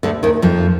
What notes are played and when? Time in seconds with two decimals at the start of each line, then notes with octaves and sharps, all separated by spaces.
0.03 D2 D3
0.23 D#2 D#3
0.42 F2 F3